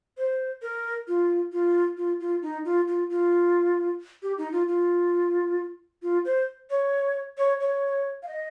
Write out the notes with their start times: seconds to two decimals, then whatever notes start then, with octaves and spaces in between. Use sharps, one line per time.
0.18 C5
0.62 A#4
1.08 F4
1.52 F4
1.97 F4
2.20 F4
2.42 D#4
2.65 F4
2.88 F4
3.10 F4
4.23 G4
4.38 D#4
4.52 F4
4.68 F4
6.02 F4
6.25 C5
6.70 C#5
7.38 C#5
7.60 C#5
8.23 F5
8.28 D#5